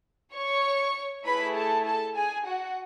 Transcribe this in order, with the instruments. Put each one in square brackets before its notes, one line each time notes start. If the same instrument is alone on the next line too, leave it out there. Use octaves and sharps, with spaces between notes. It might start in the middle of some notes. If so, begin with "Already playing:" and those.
[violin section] C#5 C#6
A3 E4 G#4 B4 B5
A4 A5
A4 A5
G#4 G#5
F#4 F#5